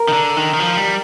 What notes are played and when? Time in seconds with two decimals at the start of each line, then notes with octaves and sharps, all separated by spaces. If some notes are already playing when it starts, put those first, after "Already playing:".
Already playing: A#4
0.08 D#3
0.13 D3
0.37 D#3
0.54 D#3
0.60 F3
0.77 G3